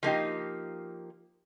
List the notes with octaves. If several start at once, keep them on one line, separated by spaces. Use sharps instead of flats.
F3 A#3 D#4 G4